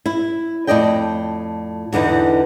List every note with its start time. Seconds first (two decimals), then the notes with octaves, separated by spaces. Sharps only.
0.06 E4
0.67 F2 A2 C#3 D5 D#5 G5
1.92 E2 D3 E3 D#4